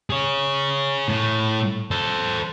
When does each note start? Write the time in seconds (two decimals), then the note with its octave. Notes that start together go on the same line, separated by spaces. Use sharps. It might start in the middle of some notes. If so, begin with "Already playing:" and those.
0.10 G#4 C#5
1.09 A2
1.91 A4 C5